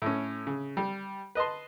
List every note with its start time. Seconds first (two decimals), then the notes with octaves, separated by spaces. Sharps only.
0.02 A2 C#4
0.47 C#3
0.77 G3
1.35 B4 D#5 A5 C6